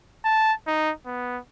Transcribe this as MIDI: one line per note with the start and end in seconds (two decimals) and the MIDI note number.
0.25 0.53 81
0.67 0.92 63
1.06 1.39 59